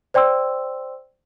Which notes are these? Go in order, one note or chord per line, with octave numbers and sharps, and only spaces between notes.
C5 D5 G5 C6 E6